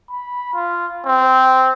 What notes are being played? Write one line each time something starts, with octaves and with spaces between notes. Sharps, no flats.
B5
F4
C4